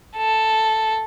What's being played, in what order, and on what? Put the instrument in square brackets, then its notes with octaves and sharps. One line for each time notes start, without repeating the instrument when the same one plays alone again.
[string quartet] A4